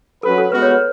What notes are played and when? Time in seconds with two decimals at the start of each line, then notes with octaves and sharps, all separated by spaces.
0.23 F#3 C#4 F#4 A4 B4
0.38 A4
0.52 G#3 B3 F#4 B4
0.62 C#5
0.71 B4